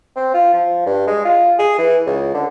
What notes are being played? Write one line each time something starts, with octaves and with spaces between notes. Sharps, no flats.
C4
F4
F3
G2
G#3
F4
G#4
E3
C#2
D3